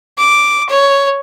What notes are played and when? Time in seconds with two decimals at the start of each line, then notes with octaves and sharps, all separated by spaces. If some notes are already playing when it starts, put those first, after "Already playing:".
0.18 D6
0.69 C#5